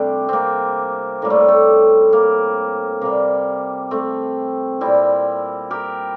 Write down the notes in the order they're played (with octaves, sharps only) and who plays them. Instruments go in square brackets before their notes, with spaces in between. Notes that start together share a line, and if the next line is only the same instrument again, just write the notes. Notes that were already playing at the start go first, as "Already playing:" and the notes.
Already playing: [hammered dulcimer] C3 G3 A3 C4 D4
A#3 C4
A2 G3 A#3
A3
A3
A#3
C3 G3 A#3
A3 C4
A#2 G3 C4 E4
G4 A#4